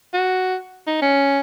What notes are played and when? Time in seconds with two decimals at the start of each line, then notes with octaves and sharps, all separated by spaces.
0.14 F#4
0.87 D#4
1.02 C#4